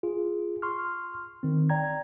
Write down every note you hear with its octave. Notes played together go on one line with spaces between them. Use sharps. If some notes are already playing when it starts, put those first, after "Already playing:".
F4 G#4
C6 C#6 F6
D#3 C4
D5 G5 A#5 G#6